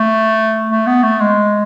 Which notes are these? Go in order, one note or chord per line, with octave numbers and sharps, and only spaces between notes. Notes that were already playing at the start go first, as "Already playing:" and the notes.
Already playing: A3
A3
B3
A3
G#3